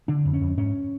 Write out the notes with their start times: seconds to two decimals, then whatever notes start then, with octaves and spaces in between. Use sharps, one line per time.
0.08 D3 D4
0.25 F2
0.33 C#4
0.41 F2
0.57 G#2 C#4